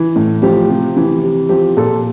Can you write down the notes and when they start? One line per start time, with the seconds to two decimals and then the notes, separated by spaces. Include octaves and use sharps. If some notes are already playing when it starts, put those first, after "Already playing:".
Already playing: E3
0.16 A2
0.42 F3 G4
0.69 C3
0.97 E3
1.23 C3
1.49 F3 G4
1.77 A#2 A4